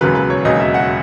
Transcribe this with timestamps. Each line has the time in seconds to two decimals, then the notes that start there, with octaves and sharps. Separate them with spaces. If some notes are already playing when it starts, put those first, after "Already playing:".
0.01 E1 D#2 C#3 F#3 B4
0.15 B4
0.30 C#5
0.45 E1 D#2 C#3 F#3 D#5
0.60 E5
0.74 F#5